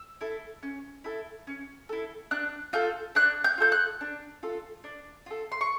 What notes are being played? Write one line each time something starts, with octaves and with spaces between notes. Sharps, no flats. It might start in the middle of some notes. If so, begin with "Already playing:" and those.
Already playing: E6
E4 A4
C#4
E4 A4
C#4
E4 A4
D4 F#6
F4 A4 G6
D4 F#6
G6
F4 A4 G6
F#6
D4
F4 A4
D4
F4 A4
C6
C#6